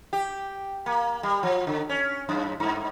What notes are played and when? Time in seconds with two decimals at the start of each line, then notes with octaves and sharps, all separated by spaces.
0.13 G4
0.86 A#3
1.23 G3
1.43 F3
1.67 D3
1.89 C#4
2.29 F#2
2.60 G2